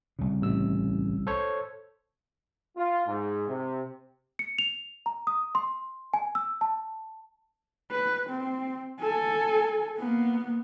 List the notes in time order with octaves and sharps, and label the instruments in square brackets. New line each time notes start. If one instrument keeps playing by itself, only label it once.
[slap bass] C2 C#3
[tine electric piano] A1 E6
A4 C5 C#5
[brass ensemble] F4
G#2
C3
[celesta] C#7
F7
A#5
D#6
C6
G#5
E6
A5
[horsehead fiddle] B4
C4
A4 G#5
A#3 B3